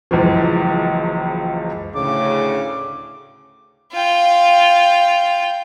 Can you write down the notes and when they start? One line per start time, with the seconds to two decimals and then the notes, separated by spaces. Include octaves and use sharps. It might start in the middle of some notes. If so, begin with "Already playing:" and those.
0.11 F#1 C#2 E3 F3
1.95 D2 A2 C#3 D6
3.92 F4 G5